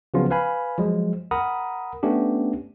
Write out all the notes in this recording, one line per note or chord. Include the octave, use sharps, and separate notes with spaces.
C#3 F3 F#3 B3 C#4 F4
B4 F5 G#5 B5
F3 F#3 G#3
A#4 F#5 A#5 B5 D#6
A3 B3 C#4 D4 G4